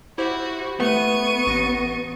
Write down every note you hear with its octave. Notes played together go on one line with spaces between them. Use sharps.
E4 F#4 G4 C5
A3 B3 C#6 D#7
A1 A6 A#6